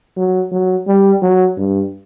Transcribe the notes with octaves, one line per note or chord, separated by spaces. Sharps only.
F#3
F#3
G3
F#3
G2